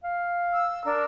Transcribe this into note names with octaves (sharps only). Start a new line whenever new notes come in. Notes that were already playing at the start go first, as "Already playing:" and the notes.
F5
E6
D4 A#4